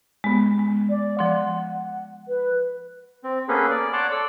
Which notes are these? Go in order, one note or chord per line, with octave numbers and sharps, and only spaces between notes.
G#3 B3
G#3
D5
F3 F#5 C6
B4
C4
A#3 B3 C#4 G#4 A4 B4
D5
C#5 D5 F#5 A5 C6 D6
A4 D5 E6